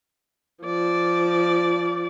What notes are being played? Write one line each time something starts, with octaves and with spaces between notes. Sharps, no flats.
F3 D5